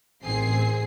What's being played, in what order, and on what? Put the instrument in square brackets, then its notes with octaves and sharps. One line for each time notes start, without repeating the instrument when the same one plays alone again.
[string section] A1 D#3 C4 G#4 C7